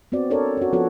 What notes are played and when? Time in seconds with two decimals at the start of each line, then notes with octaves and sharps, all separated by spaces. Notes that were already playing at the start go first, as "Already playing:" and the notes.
0.12 B3 C4 F#4 D5
0.30 D4 A4 A#4 C#5 D5
0.57 C#4 F#4
0.73 F3 B3 F#4 A4 C#5